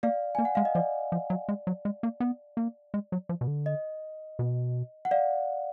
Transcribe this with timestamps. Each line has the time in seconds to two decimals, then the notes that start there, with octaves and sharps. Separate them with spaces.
0.03 A#3 D5 F5
0.35 A#3 G#5
0.45 F#5
0.55 G#3 F5
0.65 D#5
0.75 F3 D5
1.12 F3
1.30 F#3
1.49 G#3
1.67 F#3
1.85 G#3
2.03 A#3
2.20 B3
2.57 A#3
2.94 G#3
3.12 F#3
3.29 F3
3.41 B2
3.47 D3
3.66 D#5
4.39 B2
5.05 F#5
5.11 D5 F5